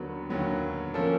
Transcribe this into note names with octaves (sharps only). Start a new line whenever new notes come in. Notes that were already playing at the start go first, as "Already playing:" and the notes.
Already playing: D#2 D3 F#3 B3 B4
D#2 D3 F#3 B3
F3 A#3 C#4 A4